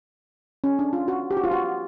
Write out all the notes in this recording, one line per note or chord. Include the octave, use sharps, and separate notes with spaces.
C#4
D4
F4
F#4
G4
F#4
F4
F#4